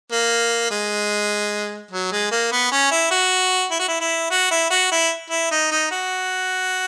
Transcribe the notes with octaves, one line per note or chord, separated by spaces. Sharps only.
A#3
G#3
F#3
G#3
A#3
B3
C#4
E4
F#4
E4
F#4
E4
E4
F#4
E4
F#4
E4
E4
D#4
D#4
F#4